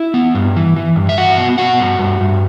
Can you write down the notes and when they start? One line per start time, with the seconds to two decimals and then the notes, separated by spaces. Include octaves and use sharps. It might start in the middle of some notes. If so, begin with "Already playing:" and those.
Already playing: E4 E5
0.14 B3
0.35 G2
0.56 E3
0.76 E3
0.96 G2
1.09 E5
1.17 G2 F#4 F#5
1.37 B3
1.58 B3 F#4 F#5
1.79 G2
1.99 G2
2.21 G2